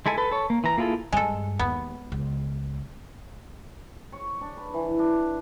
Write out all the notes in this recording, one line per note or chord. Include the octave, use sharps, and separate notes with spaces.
G#3 E4 A4 G#5
A4 B4
A4 C#5
A#3
E3 A#5
A#3 E4 F4 G#4 A4
G2 G#3 A4
D#2 B3
C#2
C#5
D4
B4
E3
D4